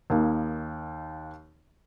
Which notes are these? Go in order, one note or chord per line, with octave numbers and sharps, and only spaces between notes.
D#2 A#3 D#4